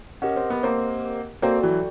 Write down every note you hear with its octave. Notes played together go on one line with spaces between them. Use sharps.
C#4 G4 A#4 D#5 F#5
C4
B3
A#3 C4
A#3 C4 F#4 A4 D5 G5
E3 F#3